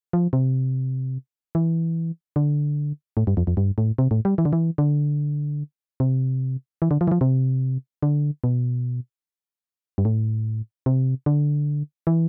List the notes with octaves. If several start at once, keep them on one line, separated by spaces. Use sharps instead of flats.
F3
C3
E3
D3
A2
G2
F2
F2
G2
A2
C3
A2
G3
E3
D3
E3
D3
C3
E3
D3
F3
E3
F3
C3
D3
B2
G2
A2
C3
D3
E3